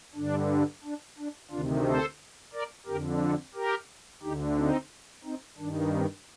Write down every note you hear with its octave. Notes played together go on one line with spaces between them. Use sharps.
G2 D3 D4
D4
D4
D2 C3 D#3 D4 F4
A4 C5
A#4 D5
F2 D3 G4 A#4
F4 A4
G4 A#4
D2 D3 D#4 G4
C4 D#4
C4 D#4
G2 D#3 D4
C4